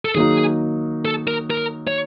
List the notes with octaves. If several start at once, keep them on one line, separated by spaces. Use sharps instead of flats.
A4
D#3 F#3 A#3 D#4 G#4
A4
A#4
A#4
C#5